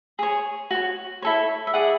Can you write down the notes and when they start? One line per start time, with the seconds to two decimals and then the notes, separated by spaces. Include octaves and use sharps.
0.19 G#4 C#5
0.71 F#4 C#5
1.22 E4 A4 C#5
1.67 E5
1.74 E4 G#4 D5 F#5